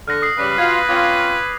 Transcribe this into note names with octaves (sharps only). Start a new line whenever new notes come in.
D3 F6 F#6 A#6
D#6 C7
C#3 G3 B4
B2 F4 G#6
C4 C#4 F4 D6